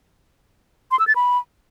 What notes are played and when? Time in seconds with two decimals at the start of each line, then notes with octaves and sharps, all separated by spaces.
0.91 C6
0.99 E6
1.07 A6
1.16 B5